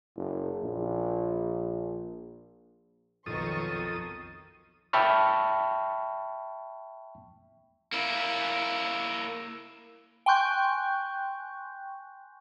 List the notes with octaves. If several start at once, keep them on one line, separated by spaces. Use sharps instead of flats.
F#1
A#1
B1 F2 D#3 A4 C#6 D#6
E5 G5 A5 B5 C#6 F6
A#3 E4
G5 G#5 C6 C#6 F#6 G6